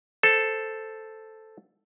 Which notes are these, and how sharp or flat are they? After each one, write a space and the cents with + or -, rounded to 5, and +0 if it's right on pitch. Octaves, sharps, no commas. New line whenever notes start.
A4 +0 C5 +0